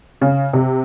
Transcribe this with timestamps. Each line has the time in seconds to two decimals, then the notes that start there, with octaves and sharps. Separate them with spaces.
0.21 C#3
0.53 C3